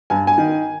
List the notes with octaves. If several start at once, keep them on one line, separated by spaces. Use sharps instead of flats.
G2 G#5
G#5
D#3